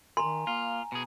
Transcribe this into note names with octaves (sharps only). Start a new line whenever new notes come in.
D#3 G#5 A#5 C6
A#3 F4
B2 G#4